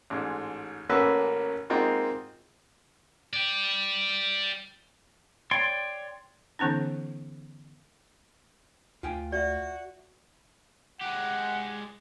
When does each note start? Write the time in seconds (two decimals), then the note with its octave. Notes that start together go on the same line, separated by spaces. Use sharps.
0.10 A1 G#2
0.89 A1 A#3 C#4 F#4 B4 E6
1.70 G#3 A#3 C4 D#4 F4 F#4
3.33 D5 G5
5.51 C#5 D5 G5 C6
6.59 D3 E3 B3 C#4 D#4
9.03 D2 F4 G5 G#5
9.32 F#4 D5 E5
11.01 G#3 G4 F#5